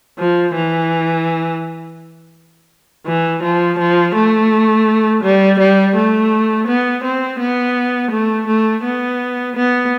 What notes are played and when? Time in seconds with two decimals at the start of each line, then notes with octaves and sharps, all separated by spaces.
0.18 F3
0.55 E3
3.06 E3
3.43 F3
3.79 F3
4.15 A3
5.24 G3
5.59 G3
5.95 A3
6.67 B3
7.04 C4
7.40 B3
8.11 A3
8.47 A3
8.84 B3
9.55 B3